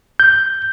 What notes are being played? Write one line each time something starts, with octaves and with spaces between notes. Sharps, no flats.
G6